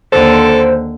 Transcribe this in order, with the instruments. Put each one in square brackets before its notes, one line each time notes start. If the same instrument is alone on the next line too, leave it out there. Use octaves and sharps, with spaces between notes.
[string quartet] D#2 D3 [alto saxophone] A4 [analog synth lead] C5